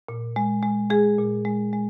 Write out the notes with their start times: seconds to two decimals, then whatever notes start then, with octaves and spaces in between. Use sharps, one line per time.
0.09 A#2
0.36 G#3
0.63 G#3
0.90 G#3 G#4
1.19 A#2
1.45 G#3
1.73 G#3